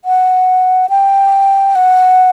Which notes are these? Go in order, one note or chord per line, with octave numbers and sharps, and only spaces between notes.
F#5
G5
F#5